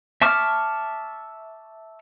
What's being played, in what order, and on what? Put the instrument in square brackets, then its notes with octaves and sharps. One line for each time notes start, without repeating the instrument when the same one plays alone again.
[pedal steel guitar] E5 A5 C#6 D6 F6